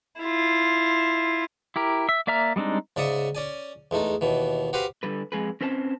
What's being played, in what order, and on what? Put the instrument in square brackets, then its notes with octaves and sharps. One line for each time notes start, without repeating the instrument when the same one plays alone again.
[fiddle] E4 F4
[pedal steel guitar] E4 G4 A#4
E5
A#3 D5 E5 A#5 F6
G3 G#3 C4 D4 D#4
[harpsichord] G#2 C#3 D5 E5 C#6 D#6
C#4 D5 G#5
E2 G#3 A3 D#4
D#2 B2 E3
F#4 G4 B4 C5 F5
[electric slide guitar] D3 G3 B4
F2 G#3 G#4 B4
C4 C#4 B4 C5 F5 A5